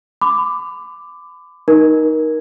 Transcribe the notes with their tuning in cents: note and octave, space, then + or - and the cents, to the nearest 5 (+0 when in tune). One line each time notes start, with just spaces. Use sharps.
B5 +30 D6 +5
D#4 +0 A#4 +20